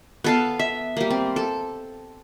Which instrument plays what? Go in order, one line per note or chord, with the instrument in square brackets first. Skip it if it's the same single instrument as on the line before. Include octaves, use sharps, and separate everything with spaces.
[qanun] B3 A4 F5
E5
G3 A#3
C4
A4